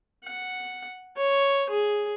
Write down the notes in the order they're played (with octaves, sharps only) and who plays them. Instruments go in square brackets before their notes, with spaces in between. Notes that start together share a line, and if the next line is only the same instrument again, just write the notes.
[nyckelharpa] F#5
C#5
G#4